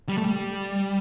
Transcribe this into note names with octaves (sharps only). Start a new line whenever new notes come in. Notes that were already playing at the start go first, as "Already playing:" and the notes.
G3
A3
G3